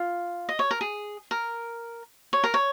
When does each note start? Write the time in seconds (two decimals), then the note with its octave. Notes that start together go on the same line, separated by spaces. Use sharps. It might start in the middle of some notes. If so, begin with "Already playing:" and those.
Already playing: F4
0.49 D#5
0.59 C#5
0.71 A#4
0.81 G#4
1.31 A#4
2.33 C#5
2.44 A#4
2.54 C#5